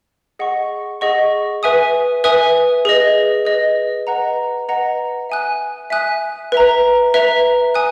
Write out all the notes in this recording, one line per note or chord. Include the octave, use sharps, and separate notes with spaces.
G#4 D#5 F#5 C#6
G#4 D#5 F#5 C#6
B4 E5 G#5 D#6
B4 E5 G#5 D#6
G#4 B4 D#5
G#4 B4 D#5
B4 D#5 F#5 A#5
B4 D#5 F#5 A#5
E5 G#5 D#6 F#6
E5 G#5 D#6 F#6
B4 E5 A#5
B4 E5 A#5
G#5 D#6 F#6